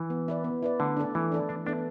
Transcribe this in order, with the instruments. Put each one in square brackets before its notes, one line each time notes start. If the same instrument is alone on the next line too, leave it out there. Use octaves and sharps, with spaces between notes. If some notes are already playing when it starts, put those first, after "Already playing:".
Already playing: [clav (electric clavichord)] E3
[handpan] B3
E4 B4 D5
B3
E4 B4 D5
[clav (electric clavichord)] D3 [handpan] A3
[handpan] D4 A4 D5
[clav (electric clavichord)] E3 [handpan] A3
[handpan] D4 A4 D5
[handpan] E3 [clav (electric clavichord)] D4
[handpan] B3 E4 A4 [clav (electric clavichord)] D4